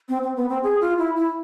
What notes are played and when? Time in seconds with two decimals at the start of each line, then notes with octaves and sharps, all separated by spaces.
0.09 C4
0.23 C4
0.37 B3
0.49 C4
0.63 G#4
0.81 F4
0.98 E4
1.16 E4